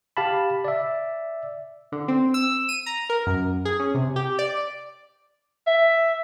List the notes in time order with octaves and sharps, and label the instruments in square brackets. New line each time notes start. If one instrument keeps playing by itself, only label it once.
[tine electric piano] G4 F5 A5 B5
D5 E5
[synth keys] D3
C4
E6
D#7
A#5
A#4
F#2
G#4
C#4
C3
G4
D5
[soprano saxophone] E5